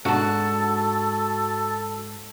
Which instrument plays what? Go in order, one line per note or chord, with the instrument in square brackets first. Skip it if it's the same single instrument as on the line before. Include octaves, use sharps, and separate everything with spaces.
[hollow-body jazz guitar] G#2 D4 F#5 [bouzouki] F#4 A5 [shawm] A4